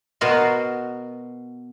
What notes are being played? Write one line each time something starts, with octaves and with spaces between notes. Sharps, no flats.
B2 B3 F#4 A#4 C6